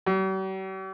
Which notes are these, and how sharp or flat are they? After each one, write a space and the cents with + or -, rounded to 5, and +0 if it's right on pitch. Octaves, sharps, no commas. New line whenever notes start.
G3 -45